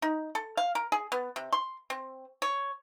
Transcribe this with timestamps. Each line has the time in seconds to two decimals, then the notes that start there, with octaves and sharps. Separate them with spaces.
0.02 D#4
0.35 A4
0.57 F5
0.75 A#4
0.92 G#4
1.12 B3
1.36 C3
1.53 C6
1.90 C4
2.42 C#5